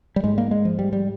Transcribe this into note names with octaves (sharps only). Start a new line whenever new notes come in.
G3
G#2 G#3
A#3
G#3
F3
G3
G3